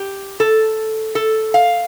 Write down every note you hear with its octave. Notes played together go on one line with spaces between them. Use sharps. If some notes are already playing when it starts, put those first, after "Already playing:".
Already playing: G4
A4
A4
F5